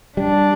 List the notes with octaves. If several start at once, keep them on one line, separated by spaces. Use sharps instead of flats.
G3 D4